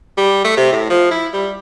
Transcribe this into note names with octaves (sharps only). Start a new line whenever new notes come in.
G3
A3
C3
A2
F3
E4
G3